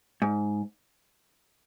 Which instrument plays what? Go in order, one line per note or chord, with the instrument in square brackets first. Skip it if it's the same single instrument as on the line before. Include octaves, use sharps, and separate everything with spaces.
[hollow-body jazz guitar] G#2